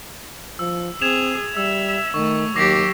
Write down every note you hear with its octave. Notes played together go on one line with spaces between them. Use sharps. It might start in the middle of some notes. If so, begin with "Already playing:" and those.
F3 E6
C4 G#4 G#6 E7 F7
G3 E5 E6
D#3 A3 C#6
D#2 F#3 G4 D6 A#6 C7